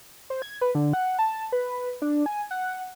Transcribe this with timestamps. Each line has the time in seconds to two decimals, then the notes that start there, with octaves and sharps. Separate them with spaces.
0.30 C5
0.42 G#6
0.61 B4
0.75 D3
0.93 F#5
1.19 A5
1.52 B4
2.02 D4
2.26 G#5
2.51 F#5